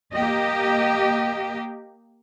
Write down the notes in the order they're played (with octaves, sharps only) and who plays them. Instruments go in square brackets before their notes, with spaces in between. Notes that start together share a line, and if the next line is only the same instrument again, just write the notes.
[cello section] A#3 G4 D#5